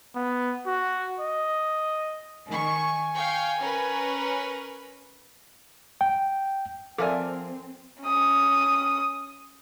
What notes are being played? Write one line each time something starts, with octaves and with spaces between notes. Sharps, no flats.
B3
F#4
D#5
D#3 G#5 C#6
F5 G5 C#6
C#4 A#4 B4
G5
F3 C4 A4 A#4 D5 E5 G#5 D6
C#4 D#6